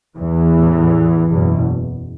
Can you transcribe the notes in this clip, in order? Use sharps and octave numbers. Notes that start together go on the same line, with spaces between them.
E2 E3
A1 A2
F#1 E2 B2